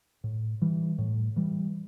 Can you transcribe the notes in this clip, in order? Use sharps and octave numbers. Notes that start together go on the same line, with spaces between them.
A2
E3 G3
A2
E3 G3